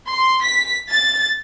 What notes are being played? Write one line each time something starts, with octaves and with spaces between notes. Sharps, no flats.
C6
B6
A6